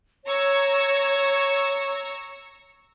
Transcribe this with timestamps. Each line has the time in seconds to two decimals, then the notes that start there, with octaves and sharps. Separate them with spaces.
0.25 C#5 A#5 C#6 E6